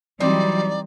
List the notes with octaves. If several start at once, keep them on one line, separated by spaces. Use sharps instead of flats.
E3 F#3 G3 C4 D#4 D5